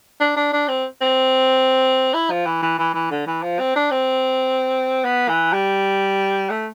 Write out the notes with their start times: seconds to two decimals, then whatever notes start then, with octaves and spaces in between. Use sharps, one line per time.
0.20 D4
0.36 D4
0.53 D4
0.68 C4
1.01 C4
2.14 E4
2.30 F3
2.46 E3
2.62 E3
2.79 E3
2.94 E3
3.10 D3
3.27 E3
3.43 F3
3.59 C4
3.76 D4
3.91 C4
5.04 B3
5.29 E3
5.53 G3
6.50 A3